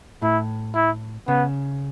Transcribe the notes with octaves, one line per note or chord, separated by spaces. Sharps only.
A2 E4
E4
C#3 B3